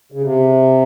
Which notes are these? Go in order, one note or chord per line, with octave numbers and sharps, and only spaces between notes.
C#3
C3